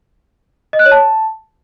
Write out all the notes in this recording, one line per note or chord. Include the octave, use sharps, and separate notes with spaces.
D#5
F#6
C#5
A5